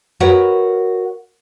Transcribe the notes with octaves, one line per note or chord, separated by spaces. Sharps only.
F#4 A#4 B4 C#5 F#5